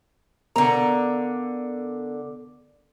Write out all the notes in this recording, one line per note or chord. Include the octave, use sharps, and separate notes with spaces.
D3 B3 A#4 A#5